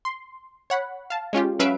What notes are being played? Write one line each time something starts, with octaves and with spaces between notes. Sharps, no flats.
C6
C#5 F#5 B5
F5 A5
G#3 C#4 F4 G4
F#3 C#4 B4 E5 F5 D7